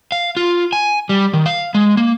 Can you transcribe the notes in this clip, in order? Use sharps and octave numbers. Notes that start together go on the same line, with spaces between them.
F5
F4
G#5
G3
D#3
F5
G#3
A#3